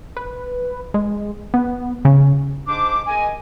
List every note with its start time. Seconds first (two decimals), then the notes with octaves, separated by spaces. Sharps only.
0.17 B4
0.94 G#3
1.54 B3
2.05 C#3
2.67 G#2 D4 C5 D6
3.07 G#3 A#4 D#5 G#5